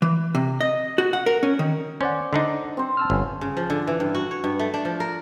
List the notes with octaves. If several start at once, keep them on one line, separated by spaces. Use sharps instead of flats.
E3
C3
D#5
F#4
F#5
A#4
C#4
D#3
C#4 C5 D5 F#5
D3 D4 D#4
C4 C5
A5 E6 F6
G1 C#4
C#3
F3
D3
E3
G2
F#4
C#5
G2
A3
D4
F3
A#4